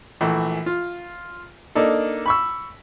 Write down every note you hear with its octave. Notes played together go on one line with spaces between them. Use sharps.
A#1 E3 A3
F4
A#3 D4 D#4 A4
B5 C#6 E6